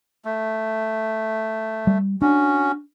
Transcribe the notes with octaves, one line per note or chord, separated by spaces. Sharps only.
A3
G3
C#4 D4 F#4